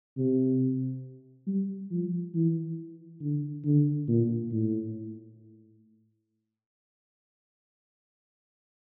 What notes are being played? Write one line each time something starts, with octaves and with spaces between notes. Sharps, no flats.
C3
G3
F3
E3
D3
D3
A#2
A2